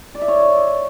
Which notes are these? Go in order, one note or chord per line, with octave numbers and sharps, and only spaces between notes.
D5
E5
C#5